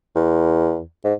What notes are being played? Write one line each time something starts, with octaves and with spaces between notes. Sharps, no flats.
E2
G#2